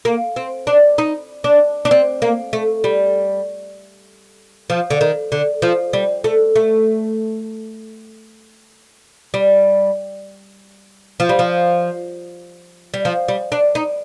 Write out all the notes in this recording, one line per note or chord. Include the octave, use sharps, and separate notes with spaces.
A#3
C4
D4
D#4
D4
D4
C4
A#3
A3
G3
F3
D3
D#3
D3
F3
G3
A3
A3
G3
F3
G3
F3
G3
F3
G3
D4
D#4